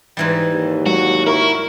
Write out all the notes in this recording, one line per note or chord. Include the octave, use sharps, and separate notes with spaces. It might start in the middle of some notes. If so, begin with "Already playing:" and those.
G#2 E3 G3
D#2
F#3 F#4
E4 A#4 C#6